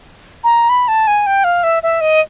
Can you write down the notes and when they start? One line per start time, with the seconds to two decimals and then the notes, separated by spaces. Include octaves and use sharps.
0.44 A#5
0.69 B5
0.88 A5
1.07 G#5
1.26 G5
1.44 F5
1.63 E5
1.83 E5
2.01 D#5